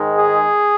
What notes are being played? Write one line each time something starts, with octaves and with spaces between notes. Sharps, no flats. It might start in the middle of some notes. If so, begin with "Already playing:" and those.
Already playing: G#2 D#3 G#3
G#4